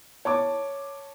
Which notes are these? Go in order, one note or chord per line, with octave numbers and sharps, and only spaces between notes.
C#5 A5 D6